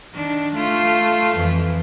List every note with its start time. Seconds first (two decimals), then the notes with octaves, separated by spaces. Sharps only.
0.13 D#3 D4
0.54 A3 F4
1.36 F2 E3